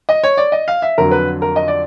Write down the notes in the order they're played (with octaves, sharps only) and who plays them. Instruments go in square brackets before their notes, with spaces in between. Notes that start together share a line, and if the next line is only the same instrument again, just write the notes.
[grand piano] D#5
C#5
D5
D#5
F5
E5
F2 D3 F#3 A#4
B4
A#4
D#5
D5